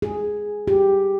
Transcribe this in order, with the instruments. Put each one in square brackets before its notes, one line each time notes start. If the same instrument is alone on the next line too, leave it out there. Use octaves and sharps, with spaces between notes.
[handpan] G#4
G4